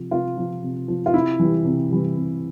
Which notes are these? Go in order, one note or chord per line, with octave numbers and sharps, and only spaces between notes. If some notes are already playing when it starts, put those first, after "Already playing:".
Already playing: C3 F3
C3 F4
F3
C3
F3
F4
C3 E4
E3 G3
C3
E3 G3
C3